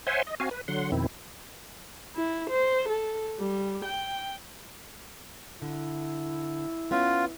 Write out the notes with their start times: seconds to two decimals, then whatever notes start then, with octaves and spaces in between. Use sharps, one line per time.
0.07 C5 C#5 E5 F#5 G#5 C6
0.27 D#5
0.40 C4 F#4 F5 G#5
0.51 B4
0.68 D3 F#3 F#5 C6
0.92 F2 B2 D#3 C4 E4
2.15 E4
2.50 C5
2.89 A4
3.39 G3
3.85 G5
5.62 D3 E4
6.91 B3 C#4 F4